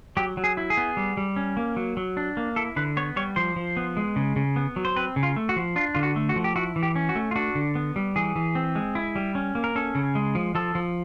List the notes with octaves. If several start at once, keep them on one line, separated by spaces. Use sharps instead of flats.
F#3 G4
F#3
G#4
E4
G#4
B3
G3
G3
C#4
A#3
F#3
F#3
D4
A#3
E4 A4
D3 B4
B3 C#5
G3 C#5
F3 C5
F3
B3
G#3
C#3
C#3
B3
F#3
C5
C4 B4
C#3
F4
A3
F#4
F3
D4 F4
D3 F4
F#4
A3
F#4
F3
G4
E4 F#4
E3
G4
C#4
F#4
A3
F4
D4 F#4
D3
B3
G3
E3 G#4
E3
C4
G#3
E4
G3
C#4
A#3
A#4
C#4 A4
C#3
G#3
F3
F3 A4
F3